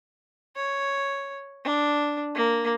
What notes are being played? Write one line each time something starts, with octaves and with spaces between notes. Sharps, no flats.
C#5
D4
A#3